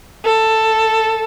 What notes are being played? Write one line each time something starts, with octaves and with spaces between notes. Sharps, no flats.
A4